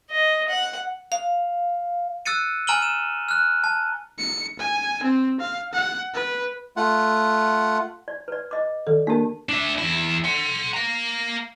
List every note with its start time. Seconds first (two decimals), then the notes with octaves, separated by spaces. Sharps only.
0.10 D#5
0.48 F#5
1.12 F5
2.26 E6 F#6 A6 C#7 D#7
2.67 G#5 A#5 F6 D#7 F#7 G7
2.82 E7
3.28 F6 F#6
3.64 A5
4.18 C#7
4.59 G#5
5.03 C4
5.40 F5
5.73 F#5
6.14 B4
6.77 A3 F4 F#5
8.08 D5
8.28 B4 D5
8.51 D#5 D6
8.87 D#3 A4
9.07 A#3 D4 G4 A#4 A5
9.49 D4 E5
9.78 E2 E4
10.24 F#5 C6
10.74 F5 A#5